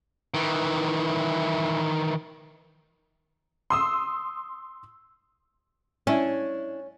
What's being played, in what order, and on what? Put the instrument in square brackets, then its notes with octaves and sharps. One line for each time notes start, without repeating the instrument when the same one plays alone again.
[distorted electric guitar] D#3 E3
[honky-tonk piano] C6 D#6 E6
[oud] C#4 [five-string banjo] D4 E4